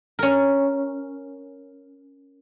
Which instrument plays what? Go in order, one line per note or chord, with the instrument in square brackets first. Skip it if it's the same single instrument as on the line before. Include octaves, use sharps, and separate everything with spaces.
[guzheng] C#4 A#4